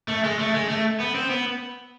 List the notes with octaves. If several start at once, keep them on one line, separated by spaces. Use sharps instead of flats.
A3
G#3
A3
G#3
A3
B3
C4
B3